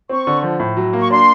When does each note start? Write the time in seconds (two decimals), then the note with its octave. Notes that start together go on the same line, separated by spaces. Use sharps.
0.09 C4 C#6
0.27 D3
0.43 F3
0.60 A2
0.77 F#3
0.93 A#3
1.00 C#6
1.10 D4 C6